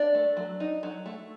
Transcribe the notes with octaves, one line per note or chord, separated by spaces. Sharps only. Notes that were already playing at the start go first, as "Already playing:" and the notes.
Already playing: D4 D5
A3
F#3
D#4
F#3
A3